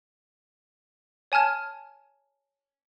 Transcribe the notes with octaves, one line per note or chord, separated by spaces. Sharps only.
C#5 G#5 A5 F6 G#6